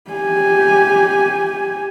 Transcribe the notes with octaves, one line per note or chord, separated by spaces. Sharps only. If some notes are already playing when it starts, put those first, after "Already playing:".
G4 G#5